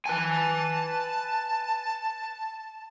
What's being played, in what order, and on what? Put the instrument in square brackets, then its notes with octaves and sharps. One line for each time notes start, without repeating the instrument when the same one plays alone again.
[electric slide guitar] B4 G#5 [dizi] A5